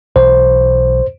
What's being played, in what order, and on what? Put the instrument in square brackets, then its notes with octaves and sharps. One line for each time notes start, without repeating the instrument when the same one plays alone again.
[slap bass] B1 E3 [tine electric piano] C5